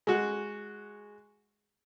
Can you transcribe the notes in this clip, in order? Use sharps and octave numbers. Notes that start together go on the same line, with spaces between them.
G#3 F#4